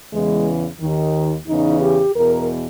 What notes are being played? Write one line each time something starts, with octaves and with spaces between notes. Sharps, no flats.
E2 C#3 E3 G#3
D#2 D#3
E2 C#3 E3 D#4
G4
E2 B2 A#4